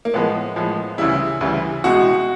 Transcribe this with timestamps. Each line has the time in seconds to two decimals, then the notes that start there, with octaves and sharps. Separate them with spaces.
0.05 A#3
0.14 A2 F3 G#3 B3
0.56 A2 F3 G#3
0.98 D2 C#3 E3 G3 E4
1.41 D2 C#3 E3 G3
1.84 C2 B2 G#3 F#4